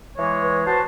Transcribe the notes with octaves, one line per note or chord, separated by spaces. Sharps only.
E3 G#3 C#5
B4
F#4 C5 A5